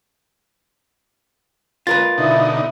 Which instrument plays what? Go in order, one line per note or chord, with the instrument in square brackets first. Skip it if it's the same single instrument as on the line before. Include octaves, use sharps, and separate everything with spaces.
[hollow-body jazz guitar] F4 A#4 B4 [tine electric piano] A6
[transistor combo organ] B2 D3 D#4 [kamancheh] E4